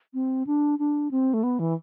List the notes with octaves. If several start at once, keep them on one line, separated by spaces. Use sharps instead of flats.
C4
D4
D4
C4
A3
B3
E3